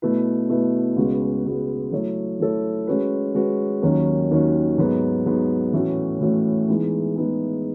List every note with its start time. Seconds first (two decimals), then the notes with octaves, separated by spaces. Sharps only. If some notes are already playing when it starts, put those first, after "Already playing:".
0.02 B2 A3 E4 B4
0.49 B2 A3 E4 B4
0.96 C#2 C#3 G#3 B3 F#4
1.45 C#2 C#3 G#3 B3 F#4
1.92 F#3 A3 E4 A4 C#5
2.40 F#3 A3 E4 A4 C#5
2.87 G#3 C#4 F#4 B4
3.35 G#3 C#4 F#4 B4
3.82 D#2 D#3 F#3 C#4
4.31 D#2 D#3 F#3 C#4
4.78 G#2 F#3 B3
5.26 G#2 F#3 B3
5.73 A2 E3 A3 C#4 F#4
6.21 A2 E3 A3 C#4 F#4
6.68 E3 G#3 B3 D#4 G#4
7.16 E3 G#3 B3 D#4 G#4